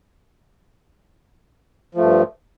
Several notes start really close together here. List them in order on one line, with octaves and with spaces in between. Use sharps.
F3 A3 G2